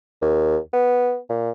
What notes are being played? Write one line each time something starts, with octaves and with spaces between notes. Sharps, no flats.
D#2
B3
A#2